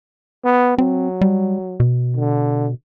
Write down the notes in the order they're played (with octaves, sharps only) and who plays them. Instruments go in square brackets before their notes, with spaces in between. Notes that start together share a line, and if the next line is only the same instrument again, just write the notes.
[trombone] B3
[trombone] F#3 [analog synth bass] C4
[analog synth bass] G3
B2
[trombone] D3